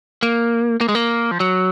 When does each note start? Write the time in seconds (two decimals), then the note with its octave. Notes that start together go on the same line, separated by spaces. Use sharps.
0.23 A#3
0.81 A#3
0.89 G#3
0.95 A#3
1.31 F3
1.40 F#3